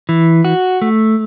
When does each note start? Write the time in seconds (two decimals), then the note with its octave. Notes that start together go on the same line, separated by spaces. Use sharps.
0.09 E3
0.45 F#4
0.82 A3